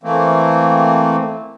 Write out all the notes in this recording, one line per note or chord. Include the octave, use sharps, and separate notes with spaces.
E3 A3 A#3 C4